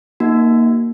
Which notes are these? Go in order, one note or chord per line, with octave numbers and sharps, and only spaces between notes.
A#3 D#4 F#4